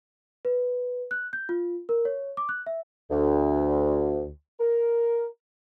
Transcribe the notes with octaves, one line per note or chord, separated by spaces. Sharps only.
B4
F#6
G6
F4
A#4
C#5
D6
F#6
E5
D2
A#4